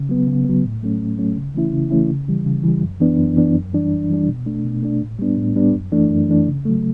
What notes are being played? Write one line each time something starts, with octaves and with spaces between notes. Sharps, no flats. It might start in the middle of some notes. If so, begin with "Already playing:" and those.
Already playing: C#3
F#3 B3
C#3
F#3 B3
A2
F#3 A3 C#4
A2
F#3 A3 C#4
C#3
E3 A3 C#4 E4
C#3
E3 A3 C#4 E4
C#3
E3 G3
C#3
E3 G3
F#2
E3 B3 D4
F#2
E3 B3 D4
F#2
E3 G3 D4
F#2
E3 G3 D4
B2
A3 D4
B2
A3 D4
A2
G3 B3 D4
A2
G3 B3 D4
F#2
E3 A3 D4
F#2
E3 A3 D4
C#3
F#3 A3